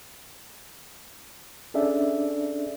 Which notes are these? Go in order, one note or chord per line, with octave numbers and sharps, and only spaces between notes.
C#4 D4 G#4 A4 D5 E5